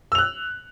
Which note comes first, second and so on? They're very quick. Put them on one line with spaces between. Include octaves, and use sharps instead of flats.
E6 F7 F#6